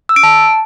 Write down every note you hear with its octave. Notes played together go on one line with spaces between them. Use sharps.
E6
D7
A5